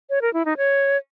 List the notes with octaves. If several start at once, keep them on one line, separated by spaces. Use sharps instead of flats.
C#5
A#4
E4
D#4
C#5